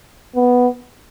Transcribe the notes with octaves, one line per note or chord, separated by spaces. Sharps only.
B3